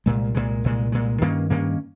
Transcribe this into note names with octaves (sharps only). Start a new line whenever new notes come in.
C2 A#2 G#3
C2 A#2 G#3
C2 A#2 G#3
C2 A#2 G#3
G2 D#3 A#3 C#4
G2 D#3 A#3 C#4